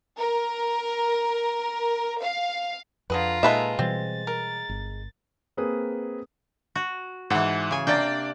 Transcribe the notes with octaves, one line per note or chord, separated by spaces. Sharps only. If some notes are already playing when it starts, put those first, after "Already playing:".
A#4
F5
F2 D3 F4 G#4 B4 A#5
A#2 G#3 D#4 A4 B4 E5
B2 E3 G3 C4 A6
A#4
G1
A#3 C4 G#4 B4 D#6
F#4
G#2 E3 A4 F#5
C#3 G#5
C3 A#3 D4 D5 G5 A6